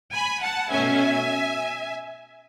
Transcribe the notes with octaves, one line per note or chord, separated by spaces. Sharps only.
G#5 B5
F#5 A5
B2 A3 C#4 E5 G#5